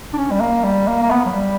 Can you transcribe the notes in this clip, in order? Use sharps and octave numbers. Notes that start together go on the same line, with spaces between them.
D4
C#4
G3
A#3
G3
A#3
A#3
B3
F#3
G3